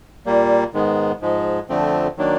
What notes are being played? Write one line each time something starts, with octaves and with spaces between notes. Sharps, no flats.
A#2 G3 A#3
G#2 D#3 G#3 B3
G#2 F3 G#3
F2 D3 F3 A3 C4
D#3 F#3 A#3 D4